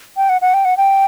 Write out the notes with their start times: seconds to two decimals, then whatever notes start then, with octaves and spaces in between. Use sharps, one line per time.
0.17 G5
0.29 F#5
0.41 F#5
0.54 G5
0.65 F#5
0.77 G5